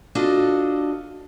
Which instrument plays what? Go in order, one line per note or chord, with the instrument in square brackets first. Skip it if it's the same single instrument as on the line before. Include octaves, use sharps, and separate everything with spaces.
[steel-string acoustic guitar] D4 F4 F#4 A4 D#5